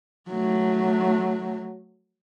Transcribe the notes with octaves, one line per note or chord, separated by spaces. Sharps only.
F#3 A3